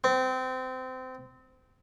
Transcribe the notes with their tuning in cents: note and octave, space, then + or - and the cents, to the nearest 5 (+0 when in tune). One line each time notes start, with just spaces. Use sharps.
C4 -25